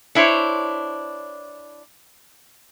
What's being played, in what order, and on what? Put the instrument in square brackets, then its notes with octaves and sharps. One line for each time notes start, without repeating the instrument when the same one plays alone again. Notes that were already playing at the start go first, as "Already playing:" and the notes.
[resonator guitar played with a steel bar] D4 E4 C5 C#5